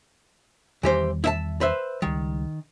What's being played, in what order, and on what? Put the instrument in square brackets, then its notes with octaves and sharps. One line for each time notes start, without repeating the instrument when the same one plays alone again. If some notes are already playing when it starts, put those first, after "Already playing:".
[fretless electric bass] E2 D#3 G3 [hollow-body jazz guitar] E3 G4 C5
[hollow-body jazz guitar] E4 E5 A5
B4 C5 E5
[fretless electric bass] C#2 G3 [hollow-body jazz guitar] D#3